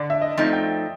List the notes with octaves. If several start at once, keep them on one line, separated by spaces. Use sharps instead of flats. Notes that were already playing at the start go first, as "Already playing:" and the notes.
Already playing: D3 D5
E5
D#5
F3 A3 C4 D#4
G5